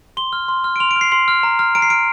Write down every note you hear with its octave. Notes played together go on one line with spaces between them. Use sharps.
C6 G7
F6
C6
F6
D7
C6 F7
D7
F6
C7
C6 C7
F6
A#5
F6
A#5 D7
C7
F6 D7